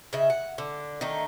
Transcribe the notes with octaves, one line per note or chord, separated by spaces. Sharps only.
C#3 D#5 E5
F#5
D3
D3 D#3 A3 D#4